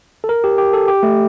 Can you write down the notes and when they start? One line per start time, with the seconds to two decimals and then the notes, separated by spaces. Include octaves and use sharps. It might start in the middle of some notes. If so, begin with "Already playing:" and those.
0.24 A4
0.29 A#4
0.44 G4
0.58 G4
0.73 A4
0.88 G4
1.03 A3